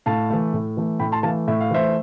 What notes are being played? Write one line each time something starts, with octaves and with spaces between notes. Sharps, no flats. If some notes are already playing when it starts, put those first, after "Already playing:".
A2 F5 A5
E3 A3
A2
E3 A3
A2 G5 B5
A5 C6
E3 A3 F5 A5
A2 E5
F5
E3 A3 C5 E5